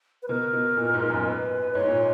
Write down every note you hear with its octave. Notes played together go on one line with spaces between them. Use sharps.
B4
B2 A#4
B2
A#2
G#2
F#2
B4
G#2 C#5
A#2